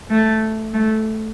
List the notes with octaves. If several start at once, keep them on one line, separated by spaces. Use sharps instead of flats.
A3
A3